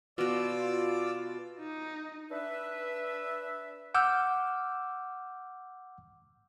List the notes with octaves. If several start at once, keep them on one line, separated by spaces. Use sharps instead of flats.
B2 F4 F#4 D5 D6 E6
D#4
D4 B4 E5
F#5 D6 E6 F6 G6